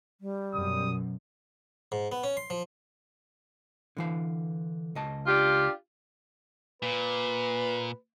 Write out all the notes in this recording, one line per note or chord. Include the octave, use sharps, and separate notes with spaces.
G3
F#2 B2 D#6
G#2
B3
C#4
C6
F3
D3 E3 F5
C#2 D#5 A5
D4 F4 G4
A#2 B4